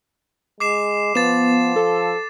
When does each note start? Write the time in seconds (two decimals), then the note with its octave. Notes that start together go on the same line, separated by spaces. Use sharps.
0.60 G#3 D6 C7 E7
1.15 F3 B3 A6 E7
1.76 A4